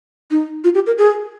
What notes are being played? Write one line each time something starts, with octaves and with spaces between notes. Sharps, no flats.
D#4
F4
G4
A#4
G#4